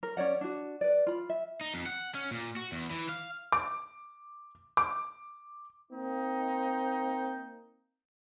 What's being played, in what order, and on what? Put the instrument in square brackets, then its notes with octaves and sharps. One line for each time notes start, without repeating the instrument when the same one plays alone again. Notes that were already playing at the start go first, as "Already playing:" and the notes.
[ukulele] A#4
C#4 C#5 D5 F#5
D4 F#4
B4 D5
F4 B5
E5
[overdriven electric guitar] D#4
F2
F#5
C#4
A#2
F#4
E2
E3
F5
[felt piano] D6
D6
[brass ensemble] A#3 C4 D#4